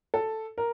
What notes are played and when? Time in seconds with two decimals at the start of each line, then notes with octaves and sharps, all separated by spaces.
0.14 A4
0.58 A#4